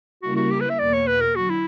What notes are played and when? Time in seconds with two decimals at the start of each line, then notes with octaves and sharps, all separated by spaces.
0.22 C#3 G3 A#3 E4 F#4 A#4
0.37 F#4
0.51 G4
0.61 B4
0.70 E5
0.79 E2 B2 A#3 D5
0.94 C#5
1.07 B4
1.21 A#4
1.36 D3 F#3 F#4
1.50 E4